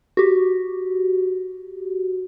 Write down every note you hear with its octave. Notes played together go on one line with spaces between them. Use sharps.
F#4 G4